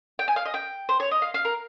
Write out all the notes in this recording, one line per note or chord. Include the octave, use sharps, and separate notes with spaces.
G5
G#5
F5
D#5
G5
C5
C#5
D#5
F5
F5
A#4